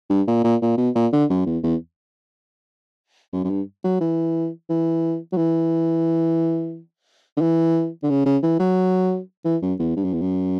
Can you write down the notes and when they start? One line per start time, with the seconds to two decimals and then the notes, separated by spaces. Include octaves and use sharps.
0.10 G2
0.27 A#2
0.44 A#2
0.62 A#2
0.78 B2
0.95 A#2
1.13 D3
1.30 F#2
1.46 E2
1.64 E2
3.33 F#2
3.44 F#2
3.50 G2
3.84 F#3
4.01 E3
4.70 E3
5.32 F#3
5.37 E3
7.37 D3
7.41 E3
8.03 D3
8.10 C#3
8.26 C#3
8.43 E3
8.60 F#3
9.45 E3
9.62 F#2
9.80 E2
9.97 G2
10.04 F#2
10.13 E2
10.22 F#2